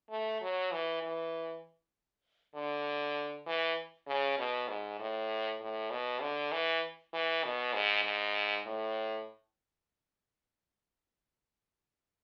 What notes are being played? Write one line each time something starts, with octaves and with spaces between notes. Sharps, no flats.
A3
F#3
E3
E3
D3
E3
C#3
B2
G#2
A2
A2
B2
D3
E3
E3
B2
G#2
G#2
A2